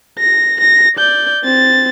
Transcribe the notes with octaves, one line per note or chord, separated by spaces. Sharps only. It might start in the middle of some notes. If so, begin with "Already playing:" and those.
A#6
A#6
D5 G6
C4 A6